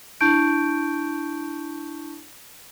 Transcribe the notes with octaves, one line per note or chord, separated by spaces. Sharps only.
D4 E4 A5 C#6 G6 D7